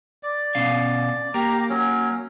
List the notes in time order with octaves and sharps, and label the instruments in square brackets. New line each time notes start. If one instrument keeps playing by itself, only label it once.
[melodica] D5
[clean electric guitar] B2 C#4 F5
[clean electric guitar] A#3 [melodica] G4 A#5
[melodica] F#3 C#4